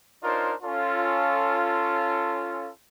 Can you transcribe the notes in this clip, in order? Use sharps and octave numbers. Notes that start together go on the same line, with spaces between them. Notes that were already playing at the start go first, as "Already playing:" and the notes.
D4 D#4 F4 A#4 C5 C#5
C#4 F4 A4